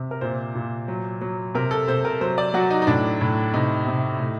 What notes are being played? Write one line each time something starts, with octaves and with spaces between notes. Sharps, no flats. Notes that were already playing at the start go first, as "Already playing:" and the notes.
Already playing: C3
A#4
A#2 C5
A#2
F#3
F#3
C3 A#4
A4
C3 C5
A#4
F#3 C5
D5
F#3 F#4
D#4
D#4
A2 D4
A2
C3 D#4
C3
A2